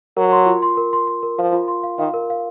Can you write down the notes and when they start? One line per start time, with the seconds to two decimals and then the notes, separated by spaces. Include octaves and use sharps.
0.17 F#3 A#4
0.32 C6
0.46 F4
0.62 C6
0.77 A#4
0.93 C6
1.07 C6
1.23 A#4
1.39 F3 F5
1.53 F4
1.68 C6
1.83 F5
1.99 D#3 F5
2.14 A#4
2.30 F5